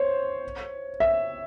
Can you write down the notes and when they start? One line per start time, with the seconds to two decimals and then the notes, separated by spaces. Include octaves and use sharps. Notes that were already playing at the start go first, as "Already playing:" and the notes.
Already playing: C5 C#5
1.00 E5